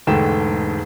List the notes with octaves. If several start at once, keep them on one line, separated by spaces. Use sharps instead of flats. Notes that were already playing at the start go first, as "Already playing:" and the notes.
E1 G#2 D3 A3 G5 E7